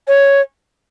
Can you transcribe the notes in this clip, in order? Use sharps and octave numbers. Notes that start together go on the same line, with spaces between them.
C#5